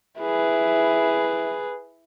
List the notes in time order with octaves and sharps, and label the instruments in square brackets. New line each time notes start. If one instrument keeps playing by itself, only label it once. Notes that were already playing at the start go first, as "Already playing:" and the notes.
[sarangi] E4 [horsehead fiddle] G#4 B4